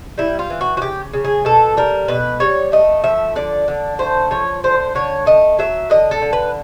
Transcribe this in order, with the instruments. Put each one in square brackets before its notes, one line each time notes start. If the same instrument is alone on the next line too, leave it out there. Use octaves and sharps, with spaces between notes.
[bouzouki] G3 E4
F4
E3
F#4
F#4
C#3 G4
C#3
G#4
B2 A4
G3 A#4
B2 B4
G3 C#5
A3 D#5
F3 E5
D3 D5
D3
A3 C5
F3 C#5
D3 C5
D3 C#5
A3 D#5
F#3 E5
D3 D#5
A4
D3
B4